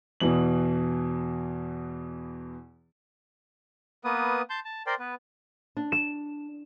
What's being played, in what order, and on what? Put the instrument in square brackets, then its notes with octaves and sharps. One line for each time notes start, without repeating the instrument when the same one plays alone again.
[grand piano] E2 B2 E3 F#7
[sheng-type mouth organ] A#3 B3 B4 D#6
A5 C6 G6
A5
A#4 C5 D5 G5 C6
B3 B4
[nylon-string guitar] D4
[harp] E7